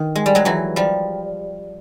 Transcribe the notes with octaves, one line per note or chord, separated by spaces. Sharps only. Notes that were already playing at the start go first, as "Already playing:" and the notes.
Already playing: D#3
G#3
G3
F#3 G#3
E3 F#3
F3 G3